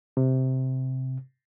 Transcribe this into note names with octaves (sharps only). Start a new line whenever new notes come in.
C3